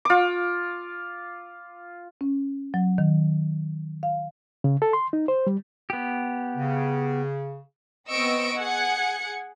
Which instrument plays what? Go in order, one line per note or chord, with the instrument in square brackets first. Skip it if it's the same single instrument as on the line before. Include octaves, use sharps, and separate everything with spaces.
[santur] F4 D6
[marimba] C#4
F#3
D#3
F5
[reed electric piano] C#3
A4
C6
D#4
C5
G3
[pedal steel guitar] B3 G4
[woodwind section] C#3
[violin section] B3 C4 D#5 C#6 E6 D7
G#4 F#5 F#6 G#6 C#7